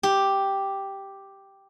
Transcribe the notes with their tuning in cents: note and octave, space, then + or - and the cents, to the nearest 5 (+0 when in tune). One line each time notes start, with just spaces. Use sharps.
G4 +0